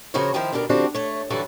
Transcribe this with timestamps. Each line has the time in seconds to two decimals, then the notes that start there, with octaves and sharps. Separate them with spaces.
0.14 C#3 F3 F#4 A#4 C5 C#5
0.34 D#3 F3 E4 A#4 C5
0.53 D#2 B2 D3 D4 G#4 A#4
0.69 D3 F3 G3 C4 D4 F#4
0.94 A3 C#5
1.30 G2 D3 E3 F#3 F#4 A4